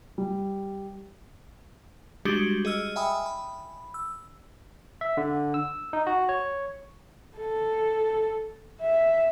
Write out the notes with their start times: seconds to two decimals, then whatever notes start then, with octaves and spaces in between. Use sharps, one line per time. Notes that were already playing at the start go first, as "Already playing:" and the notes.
0.18 G3
2.25 G3 G#3 D4 F#4 G4 C#7
2.65 G#4 D#5 E6 F6
2.96 E5 G5 G#5 B5 D#6
3.26 B5
3.94 E6
5.01 E5
5.17 D3
5.54 E6
5.93 D#4
6.07 F#4
6.29 C#5
7.38 A4
8.81 E5